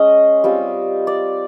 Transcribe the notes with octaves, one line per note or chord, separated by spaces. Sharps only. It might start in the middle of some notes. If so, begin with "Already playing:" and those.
Already playing: G#3 C#4 D#5
G3 C4 F4
D5